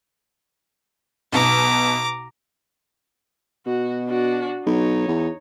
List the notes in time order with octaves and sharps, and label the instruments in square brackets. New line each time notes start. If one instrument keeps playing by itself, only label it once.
[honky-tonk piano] B1 B2 [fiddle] A#5 D6
[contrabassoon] B2 [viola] F#4
[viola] D4 F#4
[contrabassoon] B1 [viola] D#4 C#5
[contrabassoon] E2